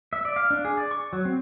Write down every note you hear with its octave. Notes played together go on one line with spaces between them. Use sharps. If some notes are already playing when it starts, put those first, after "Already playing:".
E5
D5
F5
D4
G#4
D5
C#6
F#3
C4